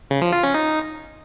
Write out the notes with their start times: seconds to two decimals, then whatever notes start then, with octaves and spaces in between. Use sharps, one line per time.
0.11 C#3
0.21 F3
0.32 F4
0.43 C#4
0.54 D#4